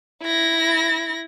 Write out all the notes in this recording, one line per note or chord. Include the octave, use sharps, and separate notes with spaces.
E4 A#6